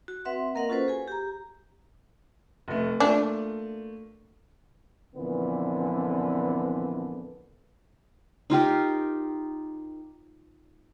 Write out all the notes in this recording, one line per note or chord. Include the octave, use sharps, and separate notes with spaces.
F#4
C4 B4 E5 F#5 C6
A#3 A#4 D#5 F5 F#5
C#4 F4 F#4 A4 B4 C5
G#4 G#5
G4 A#5
F1 A3
A3 A#3 D4 F4
F2 A#2 D3 E3 B3
D#4 F4 G4 A#4